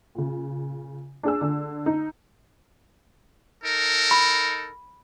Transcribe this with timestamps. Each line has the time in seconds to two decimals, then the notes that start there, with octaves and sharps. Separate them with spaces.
0.15 A#2 C#3
1.23 D4 G#4 E6
1.41 D3
1.86 D#4
3.63 D#4 A4 A#4
4.11 B5